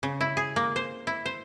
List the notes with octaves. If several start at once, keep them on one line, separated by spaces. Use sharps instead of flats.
C#3
E4
G#4
A#3
C5
E4
C5